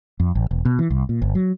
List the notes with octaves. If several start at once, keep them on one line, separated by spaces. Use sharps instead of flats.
F2
A1
E1
B2
E3
C2
A#2
G1
F#3